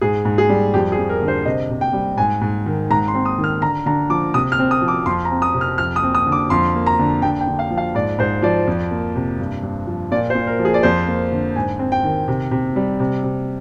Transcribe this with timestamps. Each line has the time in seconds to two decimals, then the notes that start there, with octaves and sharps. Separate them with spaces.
0.01 G#2 G#4
0.25 G#2
0.38 G#4
0.49 G3
0.74 F2 G4
0.92 G#4
0.98 F2
1.09 A#4
1.22 D3
1.28 C5
1.45 C3 D#5
1.70 C3
1.81 G5
1.93 G3
2.17 G#2 G#5
2.41 G#2
2.66 D#3
2.90 G#2 A#5
3.08 C6
3.14 C4
3.25 D#6
3.38 D#3
3.44 F6
3.62 D3 A#5
3.86 D3 A#5
4.10 F3 D6
4.34 C3 D#6
4.52 F6
4.59 C4
4.71 D#6
4.82 F3
4.88 D6
5.06 F2 C6
5.25 A#5
5.31 C4
5.42 D#6
5.54 C3
5.61 F6
5.78 F2 F6
5.96 D#6
6.03 C4
6.15 D#6
6.27 D3
6.32 D6
6.50 F2 C6
6.75 A#3
6.86 A#5
6.99 D3
7.22 D3 G5
7.40 G5
7.47 D3
7.59 F5
7.71 F3
7.78 F5
7.95 G#2 D5
8.18 G#2 C5
8.42 F3 D5
8.67 F2
8.91 A#3
9.16 C3
9.39 G2
9.63 G2
9.87 F3
10.11 A#2 D5
10.30 C5
10.35 A#2
10.47 A#4
10.59 F3
10.65 G#4
10.74 D5
10.83 F2 C5
11.07 A#3
11.32 D3
11.56 G#2 G#5
11.79 C4
11.92 G5
12.03 D#3
12.28 C3
12.51 C3
12.76 G3
13.00 C3
13.23 C3